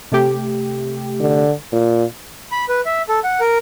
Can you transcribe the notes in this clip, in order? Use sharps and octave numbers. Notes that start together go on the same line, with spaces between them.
C3 A3 G4
D3
A#2
B5
B4
E5
A4
F#5
A#4